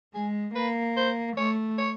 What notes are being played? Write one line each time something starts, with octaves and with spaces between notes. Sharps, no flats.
G#3 G#4
A#3 B4
C5
A3 C#5
C#5